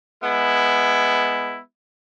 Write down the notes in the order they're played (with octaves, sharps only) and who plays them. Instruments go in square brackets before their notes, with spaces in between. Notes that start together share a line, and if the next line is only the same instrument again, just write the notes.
[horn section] G#3 B3 E4